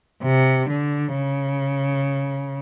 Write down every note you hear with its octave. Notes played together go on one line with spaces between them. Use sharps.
C3
D3
C#3